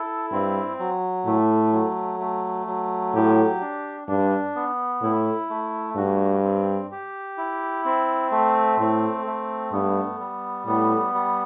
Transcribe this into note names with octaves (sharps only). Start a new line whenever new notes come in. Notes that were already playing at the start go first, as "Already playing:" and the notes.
Already playing: E4 A4
G2 C4
F#3
A2 A3
F#3
A3
F#3
A2 G4
D4
G2 D4
B3
A2 E4
A3
G2 F#4
C4
G4
E4
C4
A3
A2 C4
A3
G2 B3
G3
A2 B3
G3